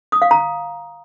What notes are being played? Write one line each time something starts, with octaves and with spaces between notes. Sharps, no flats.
D#6
F5
A#5